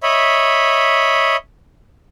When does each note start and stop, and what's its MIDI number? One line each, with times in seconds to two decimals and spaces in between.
0.03 1.36 73
0.03 1.36 75
0.03 1.36 76
0.03 1.36 83